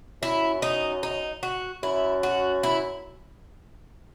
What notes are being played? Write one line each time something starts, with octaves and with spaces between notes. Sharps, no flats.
F#2 E4
D#4
D#4
F#4
F#2 E4
F#4
E4